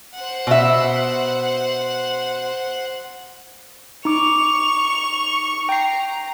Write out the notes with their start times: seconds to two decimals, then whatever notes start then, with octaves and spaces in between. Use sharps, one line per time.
0.15 C5 F#5
0.47 B2 E5
4.05 D#4 C#6 D6 F7
5.69 G5 A#5 C7